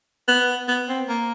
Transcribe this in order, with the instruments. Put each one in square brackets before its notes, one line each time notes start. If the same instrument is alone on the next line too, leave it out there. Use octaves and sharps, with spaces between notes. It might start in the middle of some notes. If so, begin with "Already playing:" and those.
[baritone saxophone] B3
B3
C4
A#3